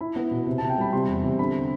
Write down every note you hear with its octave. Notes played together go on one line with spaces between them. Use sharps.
E4 B5
B3
B2
C3
A5
C3
G5
G3 B5
C3 C6
E2
C3
D3 B5